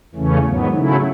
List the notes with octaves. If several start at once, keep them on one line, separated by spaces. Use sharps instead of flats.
E2 C#3 E3 A3 C#4
G#2 D#3 F#3 B3
C#3 F#3 A3 C#4 E4